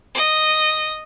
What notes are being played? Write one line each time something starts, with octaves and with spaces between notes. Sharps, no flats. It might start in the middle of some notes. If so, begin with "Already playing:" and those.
D#5